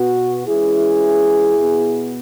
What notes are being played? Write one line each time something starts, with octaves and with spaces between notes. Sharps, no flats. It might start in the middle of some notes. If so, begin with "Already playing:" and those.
Already playing: B2 B3 F#4
E3 G#3 C#4 E4 G#4
B2 B3